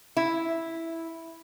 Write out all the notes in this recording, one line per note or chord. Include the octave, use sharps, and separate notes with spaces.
E4